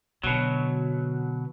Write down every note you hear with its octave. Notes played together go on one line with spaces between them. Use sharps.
B2 D3 F#3